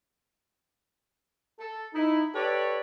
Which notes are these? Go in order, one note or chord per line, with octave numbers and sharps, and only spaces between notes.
A4
D#4 E4
G4 A4 B4 C#5 D5